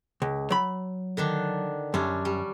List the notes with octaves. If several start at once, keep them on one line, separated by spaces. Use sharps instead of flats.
C#2
F#3 B5
D3 D#3 D4
F#2 G3 C#4 D4
G3